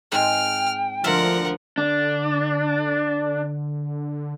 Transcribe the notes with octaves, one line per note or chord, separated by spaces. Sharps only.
G#2 G#3 C4 G5 F6
D2 D3 F3 F4 A#4 E5 F#5
D3 D4